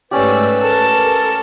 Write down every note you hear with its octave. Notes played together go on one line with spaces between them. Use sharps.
G#2 A3 C#4 G4 B4 D5 E6
A4 A#4 A5